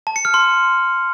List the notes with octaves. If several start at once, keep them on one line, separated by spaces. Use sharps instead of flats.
A5
C#7
F6
C6